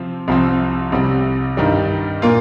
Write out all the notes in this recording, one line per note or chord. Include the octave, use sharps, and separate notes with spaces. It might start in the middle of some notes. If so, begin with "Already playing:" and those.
Already playing: C3 F3 C4
C2 C3 F3 C4
C2 C3 G3
G2 D#3 G3
A#2 A#3 F4